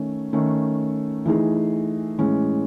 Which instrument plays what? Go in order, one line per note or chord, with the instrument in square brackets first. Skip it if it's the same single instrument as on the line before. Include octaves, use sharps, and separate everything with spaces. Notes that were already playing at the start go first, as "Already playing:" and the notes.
Already playing: [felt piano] D#3 A3 C#4
D#3 A3 C#4
E3 A3 D#4 G#4
A2 E3 G#3 C#4